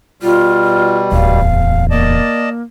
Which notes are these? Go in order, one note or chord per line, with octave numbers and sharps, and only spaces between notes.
B2 G3 F4
D1 E2 F5
A#3 D5 D#5 A5